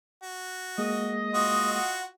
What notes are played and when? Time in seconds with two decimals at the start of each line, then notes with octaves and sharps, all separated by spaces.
0.23 F#4
0.78 G#3 A#3 G#4 D#5
1.34 F4 F#4 D#6
1.74 F#5